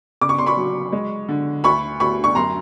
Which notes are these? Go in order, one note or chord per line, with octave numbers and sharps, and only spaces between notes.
C#3 D6
C#6
C6
B5 C#6
F#3
G#3
D3
D2 B5 C#6
D2 B5 C#6
C#6
F#2 A#5 C6